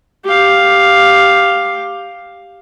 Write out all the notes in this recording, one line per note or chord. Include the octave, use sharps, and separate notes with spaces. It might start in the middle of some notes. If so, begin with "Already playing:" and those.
G4 F5